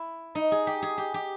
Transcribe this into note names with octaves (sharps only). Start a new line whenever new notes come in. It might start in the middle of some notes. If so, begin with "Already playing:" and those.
Already playing: E4
D#4
G#4
G4
G#4
G4
G4